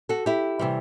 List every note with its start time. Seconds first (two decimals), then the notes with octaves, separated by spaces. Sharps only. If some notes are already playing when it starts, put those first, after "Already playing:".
0.09 F#4 A4
0.26 E4 G4
0.59 C3 E3 G3